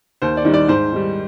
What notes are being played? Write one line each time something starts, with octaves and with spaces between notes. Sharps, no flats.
D#2 C5
D5
D#3 G3
D5
G#2 C5
D#3 G3